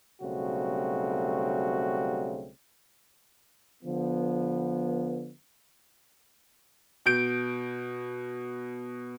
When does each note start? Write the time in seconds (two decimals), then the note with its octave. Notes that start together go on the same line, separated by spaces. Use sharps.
0.21 B1 C#3 G3 A3 C4 F#4
3.83 D3 F3 B3
7.06 B2 G6 D7